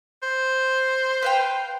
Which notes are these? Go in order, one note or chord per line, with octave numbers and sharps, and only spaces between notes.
C5
B4 F5 G5